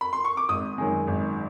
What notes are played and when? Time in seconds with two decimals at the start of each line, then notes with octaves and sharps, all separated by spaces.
0.01 B5
0.13 C6
0.25 C#6
0.37 D6
0.49 G#1 D#6
0.78 F#2 D#3 G#3
1.08 G#1